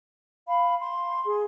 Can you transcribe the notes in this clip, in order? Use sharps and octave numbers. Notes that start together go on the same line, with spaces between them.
F5 B5
C6
G#4